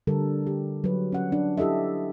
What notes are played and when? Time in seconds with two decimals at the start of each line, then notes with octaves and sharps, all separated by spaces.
0.07 D3 G3 A4 A#4
0.47 G4
0.84 F#3 B4
1.12 C#4 F#5
1.32 D4
1.57 E4 G4 A4 D#5 E5